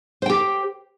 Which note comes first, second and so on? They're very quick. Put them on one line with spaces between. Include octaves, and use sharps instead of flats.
C5 G5 G4